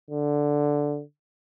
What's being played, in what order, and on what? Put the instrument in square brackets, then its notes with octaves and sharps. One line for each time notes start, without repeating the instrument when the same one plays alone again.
[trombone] D3